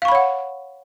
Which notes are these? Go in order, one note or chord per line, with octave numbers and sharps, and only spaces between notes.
C#5 F5 F#5 B5 C#6